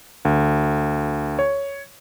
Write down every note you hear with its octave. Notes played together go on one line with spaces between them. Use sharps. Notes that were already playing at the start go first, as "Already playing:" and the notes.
D2
C#5